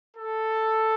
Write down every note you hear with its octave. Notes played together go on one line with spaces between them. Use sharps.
A4